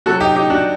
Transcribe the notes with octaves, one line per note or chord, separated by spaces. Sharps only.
C3 F#3 F#4 A4
D#4 G4
D#4 G4
D4 F#4